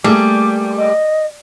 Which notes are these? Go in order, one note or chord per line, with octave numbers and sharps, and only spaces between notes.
G3 A3 A#3 G#4 D6
D#5